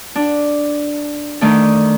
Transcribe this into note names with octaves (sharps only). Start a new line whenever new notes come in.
D4
D#3 A3 D4